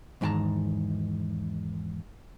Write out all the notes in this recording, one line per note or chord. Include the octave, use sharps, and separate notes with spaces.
E2 G#2 D#3 G5 A5 A#5